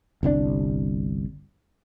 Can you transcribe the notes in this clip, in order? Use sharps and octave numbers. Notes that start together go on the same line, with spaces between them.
G1 C2 C#3 D4